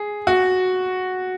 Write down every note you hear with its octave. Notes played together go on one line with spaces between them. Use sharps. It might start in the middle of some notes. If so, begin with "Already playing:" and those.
Already playing: G#4
F#4